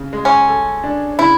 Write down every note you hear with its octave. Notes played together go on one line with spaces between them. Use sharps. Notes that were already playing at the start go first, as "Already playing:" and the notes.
Already playing: C#3
G#3
C#4
A4
D4
C#3 E4